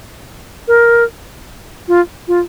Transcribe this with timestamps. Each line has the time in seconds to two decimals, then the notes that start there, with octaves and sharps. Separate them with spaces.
0.68 A#4
1.88 F4
2.28 F4